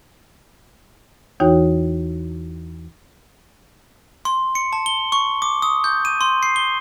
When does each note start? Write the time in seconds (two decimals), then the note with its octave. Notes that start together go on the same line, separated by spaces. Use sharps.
1.40 E2 E3 D#4 F#4 C#5 G5
4.25 C6
4.55 C#7
4.73 A5
4.86 G7
5.12 C#6
5.42 D6
5.62 D#6
5.84 G6
6.05 D#7
6.21 C6
6.43 C7
6.56 G7